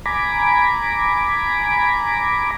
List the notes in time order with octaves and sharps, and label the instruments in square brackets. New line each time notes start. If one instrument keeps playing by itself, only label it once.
[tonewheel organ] G#5 A#5 B5 D6